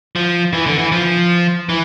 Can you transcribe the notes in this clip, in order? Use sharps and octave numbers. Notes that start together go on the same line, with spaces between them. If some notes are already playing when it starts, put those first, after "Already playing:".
F3
E3
D3
E3
F3
E3